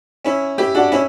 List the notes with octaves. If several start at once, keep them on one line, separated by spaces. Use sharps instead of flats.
C#4 E4
E4 G4
D4 F#4
C#4 E4